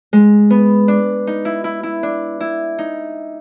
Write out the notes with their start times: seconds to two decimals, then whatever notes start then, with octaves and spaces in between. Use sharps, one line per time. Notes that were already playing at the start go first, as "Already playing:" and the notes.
0.13 G#3
0.50 B3
0.88 D4
1.27 D#4
1.45 E4
1.64 E4
1.83 E4
2.03 D4
2.40 E4
2.78 D#4